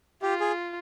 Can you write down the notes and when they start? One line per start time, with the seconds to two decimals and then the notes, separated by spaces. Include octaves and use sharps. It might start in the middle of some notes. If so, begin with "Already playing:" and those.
0.22 F4 G4
0.40 G#4